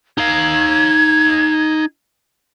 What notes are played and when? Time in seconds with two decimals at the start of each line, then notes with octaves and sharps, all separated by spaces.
0.18 D#4 F5 G#6